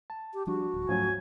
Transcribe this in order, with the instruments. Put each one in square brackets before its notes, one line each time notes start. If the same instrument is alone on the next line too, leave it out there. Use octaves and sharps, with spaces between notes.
[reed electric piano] A5
[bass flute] G4
[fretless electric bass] F3 G3 D4 [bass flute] F#4
[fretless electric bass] D1
[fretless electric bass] G#2 A3 C#4 [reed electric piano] F3 F#3 [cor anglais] G#5